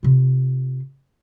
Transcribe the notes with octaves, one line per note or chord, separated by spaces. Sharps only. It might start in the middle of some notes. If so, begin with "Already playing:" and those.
C3 F4